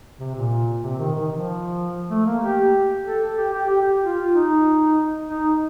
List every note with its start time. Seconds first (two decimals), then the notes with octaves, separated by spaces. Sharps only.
0.20 C3
0.35 A#2
0.83 C3
0.99 D#3
1.15 D#3
1.31 F3
2.10 A3
2.26 A#3
2.42 G4
3.05 A4
3.38 G4
3.53 G4
3.69 G4
4.01 F4
4.33 D#4
5.29 D#4